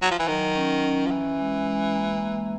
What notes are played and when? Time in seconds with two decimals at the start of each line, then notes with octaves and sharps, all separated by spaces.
0.02 F#3
0.11 F3
0.19 E3
0.28 D#3 F#3
0.55 C#4
0.84 C#4
1.06 F3
1.11 E3 C#4
1.39 G#3
1.67 G#3
1.95 A#3
2.23 A#3